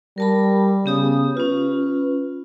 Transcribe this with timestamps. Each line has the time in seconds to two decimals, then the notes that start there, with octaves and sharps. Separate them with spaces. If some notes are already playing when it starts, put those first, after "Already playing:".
0.18 G3 A#4 A5 B5
0.86 C#3 B3 G4 D#6
1.37 C#4 F4 B4